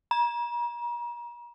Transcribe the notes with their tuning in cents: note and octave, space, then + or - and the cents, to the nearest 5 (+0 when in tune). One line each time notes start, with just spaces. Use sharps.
A#5 +40